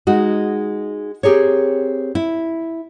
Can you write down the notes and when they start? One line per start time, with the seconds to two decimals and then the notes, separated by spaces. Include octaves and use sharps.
0.07 G#3 D#4 F#4
1.23 C4 G4 G#4 A#4 C#5
2.15 E4